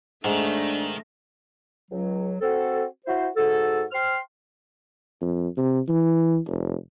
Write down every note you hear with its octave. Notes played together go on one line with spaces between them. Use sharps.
G#2 D#3 A3 D4
C#2 F#3
C4 F#4 A4
E4 F#4 C5
G#2 F#4 A4
C5 G5 C6 F6
F2
C3
E3
F1